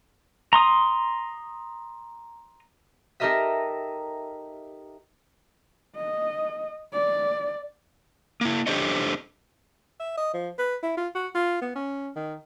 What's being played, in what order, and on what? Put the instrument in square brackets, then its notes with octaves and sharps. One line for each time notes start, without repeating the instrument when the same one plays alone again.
[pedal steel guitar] A#5 C6 D#6
[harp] D#4 G4 A4 A#4 D#5 E5
[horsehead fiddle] D#5
D5
[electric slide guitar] A#3 E4
D4 G4 A4 C5 C#5 D#5
[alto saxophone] E5
D#5
F3
B4
E4
F4
F#4
F4
B3
C#4
D#3